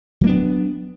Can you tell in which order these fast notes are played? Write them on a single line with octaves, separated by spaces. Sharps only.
F#3 A#3 D4 B3